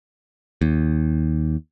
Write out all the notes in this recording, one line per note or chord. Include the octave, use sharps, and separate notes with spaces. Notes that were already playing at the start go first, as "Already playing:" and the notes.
D#2